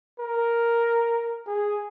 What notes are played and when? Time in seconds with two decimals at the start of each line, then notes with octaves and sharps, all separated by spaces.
0.20 A#4
1.47 G#4